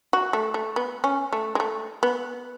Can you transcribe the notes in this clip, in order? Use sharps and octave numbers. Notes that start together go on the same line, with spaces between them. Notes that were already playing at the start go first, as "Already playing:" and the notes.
F#4
A3
A3
B3
C#4
A3
G#3
A3
B3